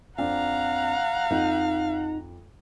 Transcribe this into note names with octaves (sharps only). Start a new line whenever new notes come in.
F2 C4 D4 F5 F#5 A#5
F2 D#4